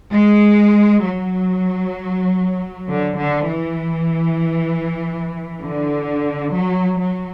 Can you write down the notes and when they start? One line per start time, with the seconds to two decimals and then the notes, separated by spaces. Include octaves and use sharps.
0.13 G#3
1.04 F#3
2.88 D3
3.18 D3
3.49 E3
5.62 D3
6.54 F#3
7.00 F#3